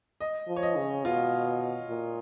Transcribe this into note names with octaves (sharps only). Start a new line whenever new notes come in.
D#5
F3
C#5
D#5
C#3
B2 F4
A#2